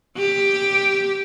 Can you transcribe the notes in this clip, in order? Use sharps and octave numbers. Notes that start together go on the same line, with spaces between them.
G4